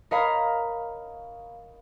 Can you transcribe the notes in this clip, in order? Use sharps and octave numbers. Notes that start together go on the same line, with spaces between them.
A#4 C#5 D#5 F5 A#5 B5